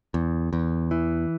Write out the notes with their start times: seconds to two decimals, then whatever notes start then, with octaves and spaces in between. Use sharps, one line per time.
0.14 E2
0.53 E2
0.91 E3